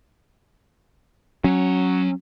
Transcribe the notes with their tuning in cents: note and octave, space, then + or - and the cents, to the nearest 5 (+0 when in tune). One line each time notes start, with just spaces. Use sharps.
F#3 +0 C#4 -15